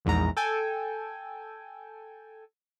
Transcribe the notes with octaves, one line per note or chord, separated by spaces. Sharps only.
A#1 E2 G#2 A#5
A4 G5 G#5